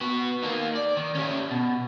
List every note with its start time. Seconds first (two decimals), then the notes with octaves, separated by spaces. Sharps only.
0.01 B3 F#4
0.43 A#3 D#4
0.75 D5
0.97 D#3
1.15 C#4 G4
1.51 B2